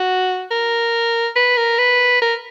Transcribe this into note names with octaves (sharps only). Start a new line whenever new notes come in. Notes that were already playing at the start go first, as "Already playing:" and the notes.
Already playing: F#4
A#4
B4
A#4
B4
A#4